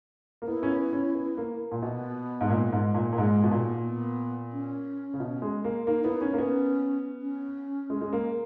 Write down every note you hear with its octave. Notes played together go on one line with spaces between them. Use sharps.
A#3
B3 E4
C#4
B3
C#4
B3
A#3
A#2
B2 B3
G#2
A#2
G#2
A#2
A#2
G#2 G#3
B2
A#2 A#3
B3
C#4
C#3
B2
G#3
A#3
A#3 D#4
B3 E4
C#4 D#4
A#3
B3 C#4
C#4
G#3
G#3
A#3